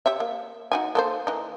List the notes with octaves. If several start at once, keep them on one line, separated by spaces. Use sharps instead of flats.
G4 C#5 E5
A#3
D#4 F#4 G#5
A#3 A4 C5
E3 D#4